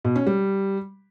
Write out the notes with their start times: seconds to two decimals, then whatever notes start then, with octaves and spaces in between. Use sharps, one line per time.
0.05 B2
0.16 C#4
0.27 G3